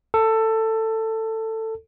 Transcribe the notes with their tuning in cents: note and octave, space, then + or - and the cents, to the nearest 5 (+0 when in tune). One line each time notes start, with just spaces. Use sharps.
A4 +15